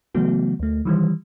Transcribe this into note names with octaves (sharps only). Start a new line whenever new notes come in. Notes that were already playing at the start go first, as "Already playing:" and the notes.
C#3 E3 F#3 A3 B3 F#4
D2 A3
D#3 E3 G3